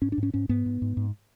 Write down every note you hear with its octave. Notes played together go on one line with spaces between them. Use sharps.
G#2 C#4
D4
G#2
C#4
G#2 C#4
G#2 B3
G#2
G#2
G#2